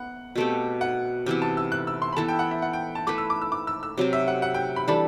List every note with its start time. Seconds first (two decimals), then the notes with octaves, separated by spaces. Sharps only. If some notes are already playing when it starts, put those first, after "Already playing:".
Already playing: B3 F#5
0.35 B2 A3 C4 G4
0.81 F#5
1.26 C3 E3 B3 E4
1.42 A5
1.57 E6
1.72 F#6
1.87 E6
2.02 C6
2.13 B5
2.17 E3 B3 E4 A4 A5
2.28 G5
2.39 F#5
2.51 E5
2.62 F#5
2.73 G5
2.95 A5
3.07 A3 E4 B4 D6
3.18 E6
3.30 D6
3.42 E6
3.52 D6
3.67 E6
3.83 E6
3.98 C3 F#3 C4
4.13 E5
4.28 F#5
4.42 F#5
4.54 G5
4.76 B5
4.88 E3 G3 D4 A4 B5